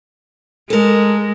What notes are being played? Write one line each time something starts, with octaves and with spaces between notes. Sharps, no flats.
G#3 A4 A#4